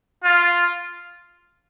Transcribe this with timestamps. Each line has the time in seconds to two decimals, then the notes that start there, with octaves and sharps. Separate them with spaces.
0.24 F4